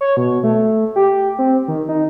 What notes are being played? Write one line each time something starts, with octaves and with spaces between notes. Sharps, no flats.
C#5
B2
A3
G4
C4
D#3
D#4